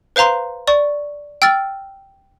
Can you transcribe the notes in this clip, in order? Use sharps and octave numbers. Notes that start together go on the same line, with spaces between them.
B4 C5 F5 A#5 C6
D5 C#6
G5 E6 F6 A6